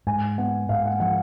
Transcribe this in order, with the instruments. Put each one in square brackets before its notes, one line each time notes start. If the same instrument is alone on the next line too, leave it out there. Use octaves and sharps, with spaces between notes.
[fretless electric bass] G#2 [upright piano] G#5
[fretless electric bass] B3 [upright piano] F#5
[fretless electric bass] G#2 [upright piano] F5
[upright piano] F#5
[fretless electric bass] F3 [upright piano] F#5